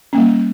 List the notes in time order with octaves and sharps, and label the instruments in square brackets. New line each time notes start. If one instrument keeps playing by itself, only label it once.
[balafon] G3 A#3 C#4